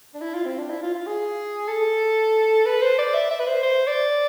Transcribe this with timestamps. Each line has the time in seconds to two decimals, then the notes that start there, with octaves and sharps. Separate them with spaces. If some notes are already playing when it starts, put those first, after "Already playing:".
0.14 D4
0.21 E4
0.34 F4
0.45 C4
0.58 D4
0.70 E4
0.82 F4
0.95 F4
1.06 G#4
1.68 A4
2.66 B4
2.82 C5
2.98 D5
3.14 E5
3.30 E5
3.40 B4
3.47 C5
3.63 C5
3.87 D5